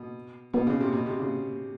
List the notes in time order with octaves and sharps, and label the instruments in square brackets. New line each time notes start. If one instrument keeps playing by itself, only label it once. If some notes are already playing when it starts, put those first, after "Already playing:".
Already playing: [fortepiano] B2
[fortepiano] B2 [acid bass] B3
[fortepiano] C#3
C3
B2
C3
C#3